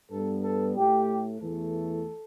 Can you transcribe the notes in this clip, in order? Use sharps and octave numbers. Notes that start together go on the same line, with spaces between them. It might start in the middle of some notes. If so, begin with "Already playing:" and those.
G2 G3 B3 A4
A4
A2 A3 G4
E2 E3 A3 A4